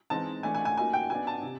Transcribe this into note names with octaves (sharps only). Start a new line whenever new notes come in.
E3 G#3 C4 D#4 A5
E3 A3 D4 G#5
G#5
G#5
F#3 A#3 D#4 G#5
G5
F#3 B3 D4 G#5
A5
C3